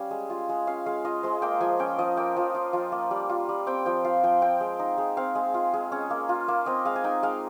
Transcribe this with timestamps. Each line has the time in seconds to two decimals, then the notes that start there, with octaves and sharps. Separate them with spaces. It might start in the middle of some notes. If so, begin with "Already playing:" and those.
Already playing: G3 C#4 F5
0.11 G#3
0.30 F4
0.49 G#3
0.67 C#4 F5
0.86 G#3 F5
1.05 F4 D#5
1.23 G#3 C5
1.42 A#3 G5
1.60 F3 G#5
1.79 C#4 G5
1.99 F3 D#5
2.17 A#3 G5
2.37 F3
2.55 F4
2.73 F3
2.92 A#3
3.11 G3
3.29 F4
3.49 G3
3.67 C4 G5
3.85 F3 G5
4.05 F4 F5
4.23 F3 G5
4.42 C4 G5
4.61 G#3
4.79 D#4
4.98 G#3
5.17 C4 F5
5.35 G#3
5.54 F4
5.74 G#3
5.92 C#4
6.10 A#3
6.29 F4
6.48 A#3
6.66 C4 D#5
6.85 G#3 F5
6.96 G#5
7.04 D#4 G5
7.23 G#3 F5